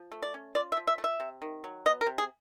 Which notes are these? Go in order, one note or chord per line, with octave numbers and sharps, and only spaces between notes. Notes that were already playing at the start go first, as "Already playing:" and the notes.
Already playing: F3
A3
D5
C#4
F4 D5
E5
F3
E5
A3
E5
C3
D#3
F#3
B3 D#5
A#4
C3
G#4